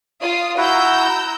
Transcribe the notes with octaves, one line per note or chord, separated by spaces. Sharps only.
F4 D#6
E4 F#4 A#5 E6 G6